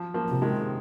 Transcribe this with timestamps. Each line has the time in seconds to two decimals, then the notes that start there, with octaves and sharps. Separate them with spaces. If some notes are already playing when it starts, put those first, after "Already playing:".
Already playing: F3
0.14 F3 A#3
0.28 C3
0.42 D#3 G#3